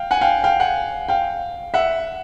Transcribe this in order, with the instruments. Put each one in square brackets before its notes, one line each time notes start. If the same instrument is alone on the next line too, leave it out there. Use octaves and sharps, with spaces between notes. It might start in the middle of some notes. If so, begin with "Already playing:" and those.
Already playing: [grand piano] F5 G5
F#5 G#5
F5 G5
F5 G5
F#5 G#5
F5 G5
E5 F#5